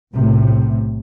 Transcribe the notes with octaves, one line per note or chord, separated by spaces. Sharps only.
B1 A2 C3